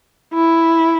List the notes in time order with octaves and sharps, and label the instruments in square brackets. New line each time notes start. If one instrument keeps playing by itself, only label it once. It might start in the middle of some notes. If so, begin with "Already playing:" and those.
[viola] E4